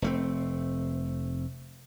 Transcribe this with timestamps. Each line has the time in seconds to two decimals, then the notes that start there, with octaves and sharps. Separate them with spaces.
0.02 F1 A3 C4